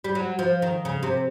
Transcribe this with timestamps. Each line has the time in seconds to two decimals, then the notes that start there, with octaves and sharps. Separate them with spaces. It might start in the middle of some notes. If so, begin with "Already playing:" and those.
0.04 G3
0.15 F#3
0.39 F3
0.62 D#3
0.85 C#3
1.03 C3